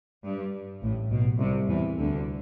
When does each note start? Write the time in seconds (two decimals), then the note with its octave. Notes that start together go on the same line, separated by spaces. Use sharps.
0.25 G2
0.82 A1 A2
1.11 B1 B2
1.40 C2 C3
1.69 E2 E3
1.98 D2 D3